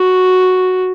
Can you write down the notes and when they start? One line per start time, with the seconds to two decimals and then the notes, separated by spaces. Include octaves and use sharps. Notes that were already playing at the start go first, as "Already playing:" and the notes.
Already playing: F#4